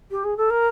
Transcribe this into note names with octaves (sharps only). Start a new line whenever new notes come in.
G4
G#4
A4
A#4